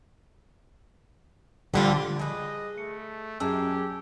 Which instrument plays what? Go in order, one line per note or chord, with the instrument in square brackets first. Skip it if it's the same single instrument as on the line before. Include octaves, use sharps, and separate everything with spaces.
[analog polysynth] D3 [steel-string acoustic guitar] F3 G3 F4
[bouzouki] G#4 B4 [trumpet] D#5
[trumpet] A3 [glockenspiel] C#7
[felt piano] F#2 [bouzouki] G#3 [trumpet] G4 [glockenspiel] A5 E6